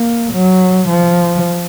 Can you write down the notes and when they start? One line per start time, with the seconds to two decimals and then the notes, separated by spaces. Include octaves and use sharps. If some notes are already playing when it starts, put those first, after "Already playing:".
Already playing: A#3
0.33 F#3
0.89 F3